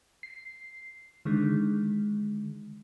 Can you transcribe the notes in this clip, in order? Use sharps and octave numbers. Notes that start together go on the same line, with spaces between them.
C7
D3 D#3 G#3